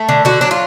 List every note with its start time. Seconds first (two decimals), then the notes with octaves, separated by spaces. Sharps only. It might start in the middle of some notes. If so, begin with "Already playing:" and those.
Already playing: A3
0.09 D3
0.25 D3 F#4
0.41 F#3 D4
0.51 F4